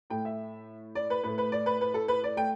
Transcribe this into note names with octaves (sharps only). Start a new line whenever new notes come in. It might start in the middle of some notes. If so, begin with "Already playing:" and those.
A2 A3 G5
E5
D5
B4
A2 A3 B4
B4
D5
B4
B4
A4
B4
D5
A3 G5